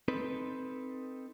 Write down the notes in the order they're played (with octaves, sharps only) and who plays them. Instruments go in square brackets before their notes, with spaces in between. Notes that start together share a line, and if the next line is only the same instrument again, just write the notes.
[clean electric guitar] C4 D#4 A4 B4